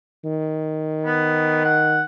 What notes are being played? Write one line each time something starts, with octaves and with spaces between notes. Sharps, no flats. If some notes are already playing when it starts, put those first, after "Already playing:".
D#3
B3
F#5